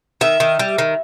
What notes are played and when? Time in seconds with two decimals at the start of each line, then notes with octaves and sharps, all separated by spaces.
0.21 D#3 E5
0.40 D#3
0.59 G3
0.78 D#3